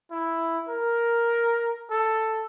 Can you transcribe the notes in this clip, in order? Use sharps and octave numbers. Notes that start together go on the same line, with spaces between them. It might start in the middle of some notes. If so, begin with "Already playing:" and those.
E4
A#4
A4